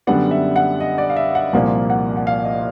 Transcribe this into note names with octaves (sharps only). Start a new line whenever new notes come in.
F#2 D3 G3 B3 D4 F#5
E5
F#5
D#5
D5
F5
E5
F#5
C2 A#2 F3 A#3 F#5
F#5
F#5
F5
D#5